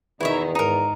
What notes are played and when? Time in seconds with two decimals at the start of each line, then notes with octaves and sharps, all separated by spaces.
0.21 E2 B2 D#3 D#4 E4 C#5 E5
0.55 G#2 D#4 A#4